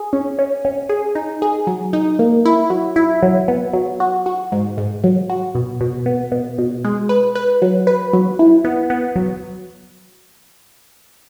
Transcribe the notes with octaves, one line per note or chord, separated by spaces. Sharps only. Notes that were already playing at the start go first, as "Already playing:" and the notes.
Already playing: G#4
C#4
C#4
C#4
G#4
D#4
G#4
F#3
D#4
A#3
E4
F#3
E4
F#3
B3
F#3
F#4
F#4
G#2
G#2
F#3
F#4
B2
B2
B3
B2
B2
G#3
B4
B4
F#3
B4
F#3
E4
B3
B3
F#3